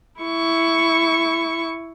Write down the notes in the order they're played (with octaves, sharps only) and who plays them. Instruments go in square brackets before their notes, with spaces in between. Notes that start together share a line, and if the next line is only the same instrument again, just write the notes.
[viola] E4 C#6